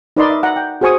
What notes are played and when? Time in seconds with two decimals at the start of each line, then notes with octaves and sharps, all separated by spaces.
0.17 D#4 A#4 B4 D5 D#5 C6
0.30 E5
0.43 F#5 A#5
0.56 G5
0.81 F#4 G#4 C5 G#5 C#6 D#6